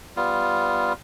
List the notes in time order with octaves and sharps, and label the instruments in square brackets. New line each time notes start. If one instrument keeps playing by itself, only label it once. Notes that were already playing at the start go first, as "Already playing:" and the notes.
[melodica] G3 B3 F4